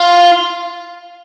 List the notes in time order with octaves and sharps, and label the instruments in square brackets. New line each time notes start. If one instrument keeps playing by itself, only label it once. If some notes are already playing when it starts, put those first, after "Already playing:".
Already playing: [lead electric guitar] F4